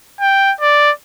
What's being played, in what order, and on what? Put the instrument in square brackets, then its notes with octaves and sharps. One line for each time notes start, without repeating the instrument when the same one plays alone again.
[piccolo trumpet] G5
D5